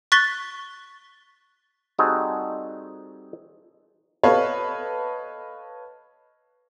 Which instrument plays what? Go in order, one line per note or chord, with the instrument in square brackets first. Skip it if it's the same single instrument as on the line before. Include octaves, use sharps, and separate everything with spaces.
[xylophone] C#6 F#6 A6 B6 G7
[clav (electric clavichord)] G3 C4 D#4 F#4 G#4 A4
[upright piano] A4 B4 C#5 D#5 F5